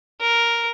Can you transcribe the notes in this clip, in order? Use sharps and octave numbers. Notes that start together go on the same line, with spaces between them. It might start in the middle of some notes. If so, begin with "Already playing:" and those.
A#4